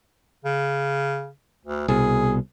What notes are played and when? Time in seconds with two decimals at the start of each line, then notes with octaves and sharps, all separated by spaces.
0.45 C#3
1.65 D2
1.88 C2 B2 G#4